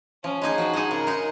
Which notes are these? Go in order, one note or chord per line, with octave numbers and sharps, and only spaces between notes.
F3 C#4
G#3 D#4 G#4
F3 F#4
G#3 D#4 G#4
C#3 A#4
G#3 D#4